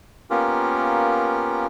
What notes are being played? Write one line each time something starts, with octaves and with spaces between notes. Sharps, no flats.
A#3 B3 C#4 F4 G4 A#4